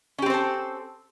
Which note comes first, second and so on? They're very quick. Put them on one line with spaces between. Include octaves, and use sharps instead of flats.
C#4 G4 C4 C5 A4